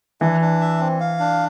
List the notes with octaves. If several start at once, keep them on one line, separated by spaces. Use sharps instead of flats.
E3 D4
D4
E5
C4
F5
D4